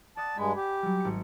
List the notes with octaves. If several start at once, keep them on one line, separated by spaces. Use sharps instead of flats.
D5 F#5 A5 D#6
G2 G#3 G#5 B5 G#6
G4
F#3 G3
G#1 C#7